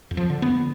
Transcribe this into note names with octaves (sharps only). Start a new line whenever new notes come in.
F2
F3
D3
B3
F2